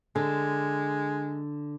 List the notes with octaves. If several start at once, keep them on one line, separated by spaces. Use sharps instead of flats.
D3 G#3